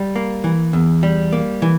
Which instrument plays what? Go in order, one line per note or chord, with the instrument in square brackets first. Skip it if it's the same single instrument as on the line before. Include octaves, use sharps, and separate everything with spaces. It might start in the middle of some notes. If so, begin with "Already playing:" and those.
Already playing: [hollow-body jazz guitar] G3
A#3
E3
E2
G3
A#3
E3